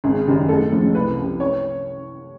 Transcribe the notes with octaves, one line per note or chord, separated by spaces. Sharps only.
G#1 G#4
F#2 D#3 G3
A1 A4
A2 F3 G#3
C2 B4
C3 F3
C#5